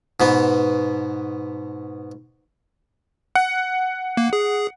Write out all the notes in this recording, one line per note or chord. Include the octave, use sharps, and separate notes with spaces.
G#2 B2 B3
F#5
A#3
G#4